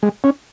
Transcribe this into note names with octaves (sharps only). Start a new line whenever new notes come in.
G#3
C#4